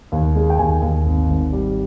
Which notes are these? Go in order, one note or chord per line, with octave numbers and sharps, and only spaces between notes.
D#2
G#3
G5
D#2 G#5
D#2
G#1
G#1
G3